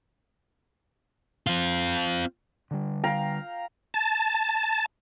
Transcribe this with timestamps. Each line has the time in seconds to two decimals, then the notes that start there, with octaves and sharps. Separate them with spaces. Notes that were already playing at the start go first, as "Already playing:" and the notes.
1.47 C4 F4
2.71 D3 G3
3.04 F5 G5 A#5
3.94 A5